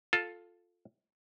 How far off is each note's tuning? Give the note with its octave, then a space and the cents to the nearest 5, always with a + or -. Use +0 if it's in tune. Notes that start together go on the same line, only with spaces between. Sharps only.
F4 +10 A4 +0